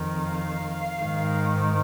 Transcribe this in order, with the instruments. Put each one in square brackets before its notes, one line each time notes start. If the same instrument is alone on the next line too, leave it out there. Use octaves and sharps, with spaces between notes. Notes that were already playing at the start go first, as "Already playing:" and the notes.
Already playing: [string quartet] F2 D#3
F5
G#2 D#3